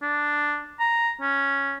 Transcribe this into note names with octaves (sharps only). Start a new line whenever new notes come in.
D4
A#5
C#4